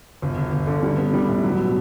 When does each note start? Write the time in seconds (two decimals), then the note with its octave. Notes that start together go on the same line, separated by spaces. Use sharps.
0.22 G1
0.37 G1
0.52 G1
0.67 D3
0.83 G3
0.97 B3
1.13 G3
1.29 A2
1.44 F#3
1.59 B2